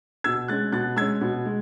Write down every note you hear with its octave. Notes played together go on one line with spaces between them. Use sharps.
B2 E6 G#6
G#3 C#4 F#6 A6
B2 F#6 A6
G#3 C#4 E6 G#6
B2
G#3